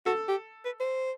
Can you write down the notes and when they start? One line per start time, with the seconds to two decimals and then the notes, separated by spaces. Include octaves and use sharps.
0.06 F#4 A4
0.28 G4
0.65 B4
0.80 C5